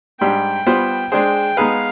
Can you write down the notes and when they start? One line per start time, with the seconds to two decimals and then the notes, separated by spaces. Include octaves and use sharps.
0.20 G#2 G3 D4 G5
0.66 G3 B3 F4 C5
1.12 G#3 D4 G#4 C5 G5
1.57 G#3 B3 D#4 G#4 B4 F5